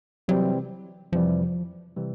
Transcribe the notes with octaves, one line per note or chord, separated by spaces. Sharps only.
C3 E3 F#3 G3 C4
F2 C3 E3 F3 G3
C3 E3 G3